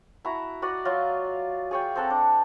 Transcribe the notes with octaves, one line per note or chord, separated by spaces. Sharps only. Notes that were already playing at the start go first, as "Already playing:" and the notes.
E4 F#4 A#5
F#4 D5 D#5 F#5
F#3 F4 F5
G#4 C#5 G5
C4 A4 F#5 A#5
D4